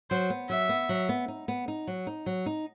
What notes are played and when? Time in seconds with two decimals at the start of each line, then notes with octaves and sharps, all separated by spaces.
0.10 F#3 C5
0.30 B3
0.49 F#3 E5
0.69 B3
0.89 F#3
1.09 B3
1.28 D#4
1.48 B3
1.68 D#4
1.87 F#3
2.07 D#4
2.26 F#3
2.46 D#4